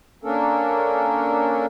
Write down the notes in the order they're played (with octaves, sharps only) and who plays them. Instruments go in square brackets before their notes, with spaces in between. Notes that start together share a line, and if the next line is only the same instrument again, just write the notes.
[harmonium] A#3 C#4 D4 A4 A#4